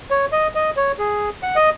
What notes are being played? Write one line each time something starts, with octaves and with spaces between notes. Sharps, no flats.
C#5
D#5
D#5
C#5
G#4
F#5
D#5